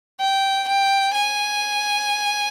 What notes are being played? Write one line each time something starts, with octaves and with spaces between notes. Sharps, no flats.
G5
G5
G#5